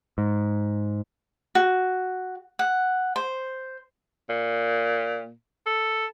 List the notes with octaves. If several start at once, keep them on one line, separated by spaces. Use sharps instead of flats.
G#2
F#4
F#5
C5
A#2
A4